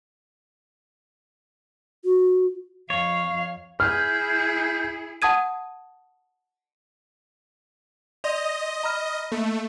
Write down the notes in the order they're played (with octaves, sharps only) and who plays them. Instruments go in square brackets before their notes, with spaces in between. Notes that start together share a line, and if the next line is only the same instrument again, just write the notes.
[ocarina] F#4
[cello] F2 F5 [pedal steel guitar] C#5
[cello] E4 G#4 [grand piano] F6 [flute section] G6
[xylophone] F#5 A5 D#6 G#6 D#7
[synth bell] D5 C6 A#6 [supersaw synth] D#5
[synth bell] A#5 B5 F6
[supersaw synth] A3 [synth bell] A#3